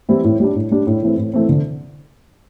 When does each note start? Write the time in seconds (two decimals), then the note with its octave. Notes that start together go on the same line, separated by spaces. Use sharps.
0.09 E3 G3 C4 E4
0.24 A2
0.40 G3 D4
0.55 A2
0.71 G3 D4
0.87 A2
1.03 E3 A3 C4
1.17 A2
1.34 E3 A3 C4
1.49 D3